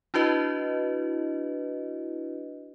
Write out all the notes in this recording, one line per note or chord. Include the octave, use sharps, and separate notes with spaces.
D4 E4 F#4 B4 D#5